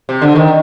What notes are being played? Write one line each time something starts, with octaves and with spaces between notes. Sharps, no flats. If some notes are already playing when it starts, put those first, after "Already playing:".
C3
D3
D#3